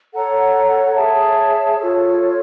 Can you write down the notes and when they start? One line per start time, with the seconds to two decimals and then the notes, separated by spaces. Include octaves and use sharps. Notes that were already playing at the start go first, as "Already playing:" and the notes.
0.13 A4 C#5 F#5 A#5
0.95 G#4 C#5 E5 A5
1.78 F4 A4 C#5